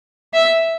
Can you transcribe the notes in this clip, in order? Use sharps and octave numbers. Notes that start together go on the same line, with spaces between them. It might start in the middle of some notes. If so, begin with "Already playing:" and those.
E5